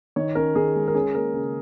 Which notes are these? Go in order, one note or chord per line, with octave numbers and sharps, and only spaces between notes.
D#3 C#5
C#4 A#4
D#3 G#4
G#3
A#4
C#4 G#4
A#3 A#4
C#3